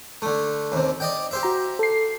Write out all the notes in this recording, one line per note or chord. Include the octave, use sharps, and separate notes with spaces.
D3 A3
D#2 C3
D5 D#5 G5
G4 C5 E5
F#4 A#5
A4 C7